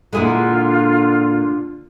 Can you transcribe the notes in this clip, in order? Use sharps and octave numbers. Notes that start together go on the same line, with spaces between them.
A#2 D3 G#3 E4 F4 G#4